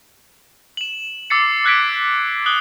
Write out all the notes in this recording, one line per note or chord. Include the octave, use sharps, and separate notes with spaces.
E7 F#7
D6 E6 A6 C7 C#7
E6 F#6 G#6 B6 D7
D#6 F#6 F#7 G7